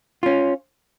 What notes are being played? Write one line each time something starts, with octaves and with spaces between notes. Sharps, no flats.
C#4 F4